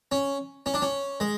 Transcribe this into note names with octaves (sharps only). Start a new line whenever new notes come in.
C#4
C#4
D4
C#4
G#3